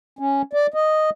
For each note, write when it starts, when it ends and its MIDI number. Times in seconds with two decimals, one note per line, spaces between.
0.19 0.42 61
0.53 0.67 74
0.74 1.10 75